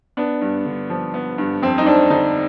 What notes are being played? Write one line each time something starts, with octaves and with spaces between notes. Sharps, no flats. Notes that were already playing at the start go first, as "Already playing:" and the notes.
B3 D4
G2
D3
F3
B3
G2
F2 C4
D#4
F2 D4
D3 D#4